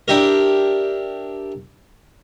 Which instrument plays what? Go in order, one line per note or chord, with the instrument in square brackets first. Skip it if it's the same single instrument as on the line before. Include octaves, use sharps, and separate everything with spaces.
[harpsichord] D4 E4 G4 A#4